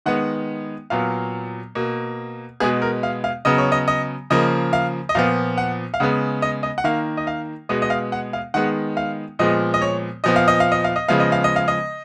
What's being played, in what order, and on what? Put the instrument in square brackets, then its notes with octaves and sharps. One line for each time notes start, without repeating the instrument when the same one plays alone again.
[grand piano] D#3 G#3 B3 F#5
A#2 F#3 B3 F5
B2 A#3
B2 G#3 B3 G#4
A#4
F5
F5
C#3 F#3 B3 D#5
C#5
D#5
D#5
C#3 F3 A#3 D#5
F5
D#5
A#2 F3 B3 F5
F#5
F5
C#3 G#3 B3 F#5
D#5
D#5
F#5
D#3 A#3 F5
D#5
F5
B2 G#3 B3 D#5
D#5
F5
F#5
F5
D#3 G#3 B3 F#5
F5
A#2 F3 G#3 B3 D#5
D#5
C#5
A#2 F3 B3 D#5
F5
D#5
F5
D#5
F5
D#5
C#3 F3 G#3 B3 F5
D#5
F5
D#5
F5
D#5